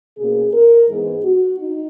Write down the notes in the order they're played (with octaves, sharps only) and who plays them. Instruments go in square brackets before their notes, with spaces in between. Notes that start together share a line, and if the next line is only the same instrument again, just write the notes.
[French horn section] B2 A#3 C#4 G#4
A#4
G#2 E3 G#3 B3 G#4
F#4
D#4